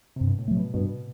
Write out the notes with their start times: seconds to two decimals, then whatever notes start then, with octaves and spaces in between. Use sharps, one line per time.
0.16 G2 C3
0.28 B2
0.39 A2
0.48 F#3 A3
0.57 B2
0.74 G2 B2